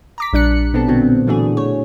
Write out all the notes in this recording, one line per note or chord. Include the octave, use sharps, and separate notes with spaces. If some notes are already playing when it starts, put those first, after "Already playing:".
A#5 D6 B6
A#1 G3 D4 F#6 C#7
B2 B3 C4 D4 A4
A#2 D3 F#3 B3 C4
A#2 E3 A3 D4 F#4 G#4
A3 C#5